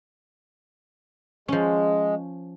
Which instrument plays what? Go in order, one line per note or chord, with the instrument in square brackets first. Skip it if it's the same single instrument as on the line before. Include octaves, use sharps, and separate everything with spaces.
[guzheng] F3 C#4 [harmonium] G#3